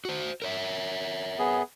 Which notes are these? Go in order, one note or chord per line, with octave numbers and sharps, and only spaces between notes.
F#4 C5
A#4 C#5 E5
B3 G#4